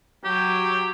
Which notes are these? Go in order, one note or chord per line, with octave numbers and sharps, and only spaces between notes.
F#3 G4